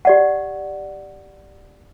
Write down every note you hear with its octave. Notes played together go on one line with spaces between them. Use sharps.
G4 D5 F#5